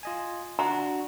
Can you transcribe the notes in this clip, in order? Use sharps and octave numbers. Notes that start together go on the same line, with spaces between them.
F4 D#5 G#5
D4 F#4 A#5